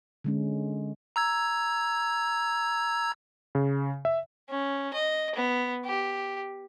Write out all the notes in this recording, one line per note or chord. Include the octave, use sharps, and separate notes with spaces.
D3 G#3 C#4
A#5 E6 G#6
C#3
E5
C#4
D#5
B3
G4